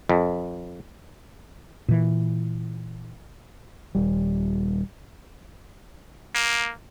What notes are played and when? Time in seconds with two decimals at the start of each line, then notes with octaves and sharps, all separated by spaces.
0.09 F2
1.88 A#2 E3
3.95 D#1 G3
6.35 A#3